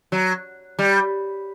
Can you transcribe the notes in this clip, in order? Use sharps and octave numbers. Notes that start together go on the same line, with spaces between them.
F#3
G3